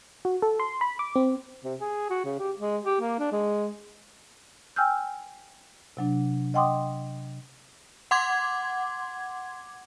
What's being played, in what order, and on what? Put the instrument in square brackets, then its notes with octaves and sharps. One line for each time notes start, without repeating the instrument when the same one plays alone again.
[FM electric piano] F#4
A4
C6
B5
D6
C4
[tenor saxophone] C3
G#4
F#4
C#3
G4
G#3
G4
A#3
D4
G#3
[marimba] G5 G#5 E6 F6 G6
C3 F#3 D4
D#5 F#5 G5 C6 D6 D#6
[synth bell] F#5 C6 D6 G#6